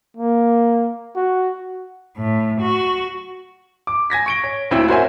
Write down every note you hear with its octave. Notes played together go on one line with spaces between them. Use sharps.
A#3
F#4
A2
F#4
D6
G#5 G#6 A#6 B6
C#6 D7 G7
C#5
D2 A#2 C4 E4 G5 E6
F#4 A#4 C5 C#5 E5 G#5